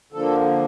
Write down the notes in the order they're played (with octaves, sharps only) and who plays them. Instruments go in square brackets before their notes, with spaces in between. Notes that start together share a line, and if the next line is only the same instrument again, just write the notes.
[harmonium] D3 F3 A#3 A4